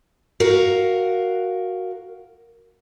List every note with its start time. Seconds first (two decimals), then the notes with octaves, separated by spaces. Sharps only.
0.40 F#4 A#4 F5